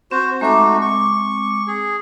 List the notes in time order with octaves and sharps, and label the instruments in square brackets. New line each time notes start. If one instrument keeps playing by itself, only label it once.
[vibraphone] C4 [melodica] F#4 C5
[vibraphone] G#3 C4 D6 [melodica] A3 D#4 F#4
[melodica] C#6
G#4